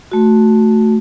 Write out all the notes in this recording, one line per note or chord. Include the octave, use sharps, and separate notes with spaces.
A3 F#4